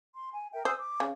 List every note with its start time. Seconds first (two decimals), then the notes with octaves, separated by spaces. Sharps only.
0.15 C6
0.32 G#5
0.53 A#4 E5 G5
0.65 C5 G#5 D#6 E6
0.79 D6
1.00 C#3